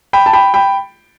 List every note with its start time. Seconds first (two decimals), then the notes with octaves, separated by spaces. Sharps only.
0.13 G5 B5
0.26 A5
0.33 G5 B5
0.54 G5 B5